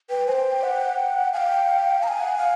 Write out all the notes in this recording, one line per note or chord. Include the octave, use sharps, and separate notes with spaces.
B4 G5
C5 G5 G#5
F#5
F5 G5 G#5
F5 G#5 A#5
F#5
F5